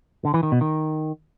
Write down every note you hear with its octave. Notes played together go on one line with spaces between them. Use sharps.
D3
E3
D#3
B2
D#3